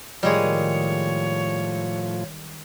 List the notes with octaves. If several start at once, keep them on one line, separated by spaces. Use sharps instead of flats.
A2 D#3 F3 G3 G#3 G#4 C#5